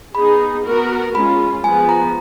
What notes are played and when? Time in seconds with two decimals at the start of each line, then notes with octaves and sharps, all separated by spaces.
0.15 B3 D#4 G#4 B5
0.65 B3 F#4 A#4
1.14 G#3 C#4 F4 B5
1.64 F3 G#3 B3 G#5
1.89 A#5